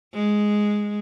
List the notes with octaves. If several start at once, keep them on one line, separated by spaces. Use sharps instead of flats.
G#3